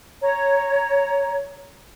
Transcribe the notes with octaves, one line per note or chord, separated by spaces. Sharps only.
C#5 A#5